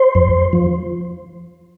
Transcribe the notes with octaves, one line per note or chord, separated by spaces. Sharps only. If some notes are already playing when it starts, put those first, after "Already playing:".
Already playing: C5
F2
F3